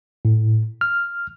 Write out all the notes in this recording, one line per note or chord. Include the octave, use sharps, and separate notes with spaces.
A2
F6